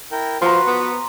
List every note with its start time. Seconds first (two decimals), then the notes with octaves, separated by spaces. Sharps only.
0.12 E4 A#4 G5
0.42 F3 F#4 B4 A#5 C6
0.67 B3